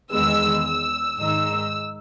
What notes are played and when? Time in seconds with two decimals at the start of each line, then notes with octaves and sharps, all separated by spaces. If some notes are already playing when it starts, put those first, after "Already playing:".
0.12 E2 D#3 G#3 B3 E6
0.65 E6
1.20 G#2 D#3 G#3 D#4 E6